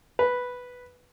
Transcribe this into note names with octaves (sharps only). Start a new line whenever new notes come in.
B4